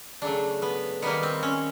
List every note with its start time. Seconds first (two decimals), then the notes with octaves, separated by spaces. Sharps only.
0.22 C#3 F#3 A3 D4
0.62 B3
1.02 D#3 G3 A#3 B3
1.23 C4
1.43 C#4